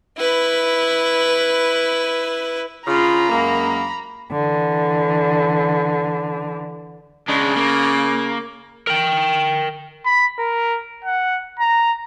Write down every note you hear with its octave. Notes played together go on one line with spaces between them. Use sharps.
E4 B4
C#3 F4 A#5 B5
F#2 G#3 A#3
D3 E3
C#3 G#3 D4
A#3
A#4 G5
B5
A#4
F#5
A#5